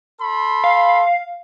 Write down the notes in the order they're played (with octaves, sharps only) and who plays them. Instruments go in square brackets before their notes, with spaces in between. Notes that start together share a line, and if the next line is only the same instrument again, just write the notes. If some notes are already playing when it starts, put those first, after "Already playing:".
[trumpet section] A4 B5 C6
[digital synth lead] F5